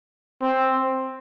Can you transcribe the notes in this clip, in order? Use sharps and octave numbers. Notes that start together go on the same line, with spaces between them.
C4